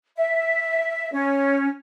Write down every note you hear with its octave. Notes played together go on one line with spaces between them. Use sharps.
E5
C#4